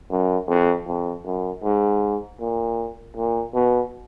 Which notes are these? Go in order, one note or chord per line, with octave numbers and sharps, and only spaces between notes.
F#2
F2
F2
F#2
G#2
A#2
A#2
B2